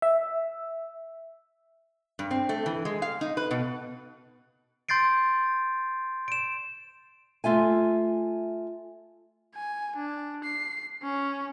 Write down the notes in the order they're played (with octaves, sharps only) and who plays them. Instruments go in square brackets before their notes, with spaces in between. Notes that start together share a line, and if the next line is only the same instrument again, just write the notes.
[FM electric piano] E5
[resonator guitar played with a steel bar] G2
C4
A3
E3
G#3
F5
D#4
B4
B2
[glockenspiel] C6 G6 A6 C7 D7
D7 E7
[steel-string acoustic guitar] A3 F4 E5 G#5
[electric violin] G#5
D4
C7
C#4